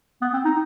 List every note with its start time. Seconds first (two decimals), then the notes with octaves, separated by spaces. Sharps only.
0.22 B3
0.33 C4
0.45 D#4